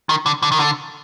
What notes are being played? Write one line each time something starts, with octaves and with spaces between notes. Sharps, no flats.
D#3
D3
D3
D#3
D3